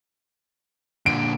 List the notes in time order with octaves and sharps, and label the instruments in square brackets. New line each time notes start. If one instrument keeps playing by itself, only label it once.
[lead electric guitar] A#2 D3 [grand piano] D7